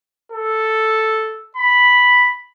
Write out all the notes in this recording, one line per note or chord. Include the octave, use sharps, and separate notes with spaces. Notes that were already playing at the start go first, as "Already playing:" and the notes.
A4
B5